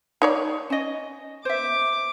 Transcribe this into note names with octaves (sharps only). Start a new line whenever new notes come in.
D#4 C#5 D5
C#4 D#5
C5 E5 D6